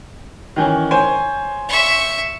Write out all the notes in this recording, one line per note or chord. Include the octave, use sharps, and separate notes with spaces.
D#3 E3 C#4
C5 C#5 G#5
E5 C#6